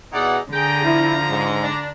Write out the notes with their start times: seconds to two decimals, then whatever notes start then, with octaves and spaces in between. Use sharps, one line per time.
0.13 B2 D#4 E4 G#4 D5 F#5
0.52 D3 G#4 G5 A#5
0.84 F3 E4
1.29 G#2
1.62 D4